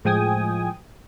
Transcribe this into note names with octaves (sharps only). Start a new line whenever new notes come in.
A2 F3 G#3 G5 G#5 D#6